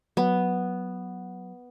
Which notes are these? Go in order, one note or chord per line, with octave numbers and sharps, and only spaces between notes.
F#3 B3